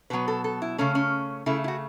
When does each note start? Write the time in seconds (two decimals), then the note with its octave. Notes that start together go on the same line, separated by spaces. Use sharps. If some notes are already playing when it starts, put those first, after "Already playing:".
0.10 B2 F#3 B3 B4
0.28 A4
0.44 A4
0.62 E4
0.78 C#3 A3 C#4
0.95 C#4
1.46 C#3 A3 E4
1.64 E4
1.68 F#4